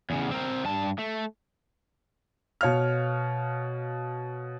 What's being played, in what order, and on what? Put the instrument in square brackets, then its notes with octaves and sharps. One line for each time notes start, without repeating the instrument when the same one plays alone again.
[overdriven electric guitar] E2 C#3
C4 A#4
G2 A5
A3
[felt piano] B2 C#5 F5 F6